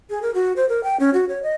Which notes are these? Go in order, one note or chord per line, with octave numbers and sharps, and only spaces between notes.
G#4
A#4
F#4
C5
A#4
G5
C#4
F#4
C#5
D#5